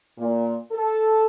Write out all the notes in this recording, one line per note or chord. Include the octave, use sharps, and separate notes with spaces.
A#2
A4